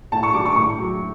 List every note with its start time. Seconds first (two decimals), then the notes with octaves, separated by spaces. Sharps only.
0.12 A2 A5
0.23 C#6
0.34 G3 D6
0.46 C#6
0.56 A2 C#6
0.79 F#3